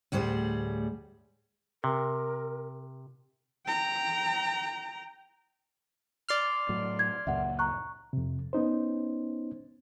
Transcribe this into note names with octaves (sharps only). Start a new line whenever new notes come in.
D2 A2 G3 G#4 C5
C3 A#4
G5 A#5
D5 C6 F6
A2 F#3
G#6
C#2 F#2 A#2 E5 F#5
A#5 C#6 F#6
F2 C3
B3 C#4 D#4 C5